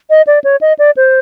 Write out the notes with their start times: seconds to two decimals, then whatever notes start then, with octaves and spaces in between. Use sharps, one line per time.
0.10 D#5
0.27 D5
0.44 C#5
0.61 D#5
0.79 D5
0.96 C5